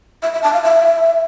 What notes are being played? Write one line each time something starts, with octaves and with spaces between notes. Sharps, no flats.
E5
E5
A5
F5
E5